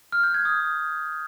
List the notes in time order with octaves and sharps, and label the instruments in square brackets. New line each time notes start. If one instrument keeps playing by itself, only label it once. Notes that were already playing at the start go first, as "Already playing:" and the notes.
[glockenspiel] F6
G6
G#6
D#6